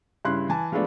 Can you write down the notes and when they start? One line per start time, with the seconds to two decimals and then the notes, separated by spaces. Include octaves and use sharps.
0.25 G2 C#3 E4 C6 F#6
0.49 E3 G#5 A5
0.72 F3 G#3 A3 B3 D4